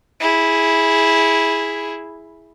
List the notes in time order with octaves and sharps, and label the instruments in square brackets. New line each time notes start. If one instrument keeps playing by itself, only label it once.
[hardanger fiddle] E4 G#4